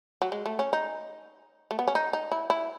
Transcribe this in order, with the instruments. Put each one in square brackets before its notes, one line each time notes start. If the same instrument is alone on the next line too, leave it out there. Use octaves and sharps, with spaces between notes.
[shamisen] F#3
G#3
A3
C#4
D#4
A3
B3
C#4
D#4
D#4
E4
E4